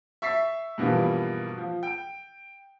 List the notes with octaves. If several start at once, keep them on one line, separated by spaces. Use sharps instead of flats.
E5 C#6 A6 B6 C7
G2 B2 E3 F3 G3 A#3
F3
G5